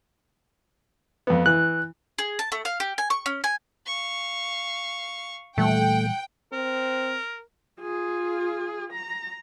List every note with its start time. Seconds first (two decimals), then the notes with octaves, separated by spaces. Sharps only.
1.27 F2 B3
1.46 E3 F#6
2.18 G#4
2.39 A5
2.52 A3
2.65 F5
2.80 G4
2.98 G#5
3.10 C#6
3.26 C#4
3.44 G#5
3.86 F5 C#6
5.58 A#2 E3 G3 A3 F#5 G5
6.53 C4 A#4
7.81 F4 G#4
8.92 A#5